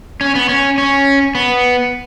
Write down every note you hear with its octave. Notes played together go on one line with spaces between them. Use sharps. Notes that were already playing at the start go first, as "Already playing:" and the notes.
C#4
B3
C#4
C#4
B3